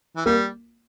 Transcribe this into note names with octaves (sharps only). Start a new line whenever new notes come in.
E3
G3 A#3